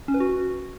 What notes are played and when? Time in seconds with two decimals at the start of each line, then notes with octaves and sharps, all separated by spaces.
0.08 C#4
0.14 B4
0.20 F#4